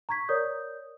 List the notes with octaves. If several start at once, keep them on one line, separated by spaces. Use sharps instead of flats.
A#5 C#6 G#6 B6
A#4 C#5 D5 D#6 G6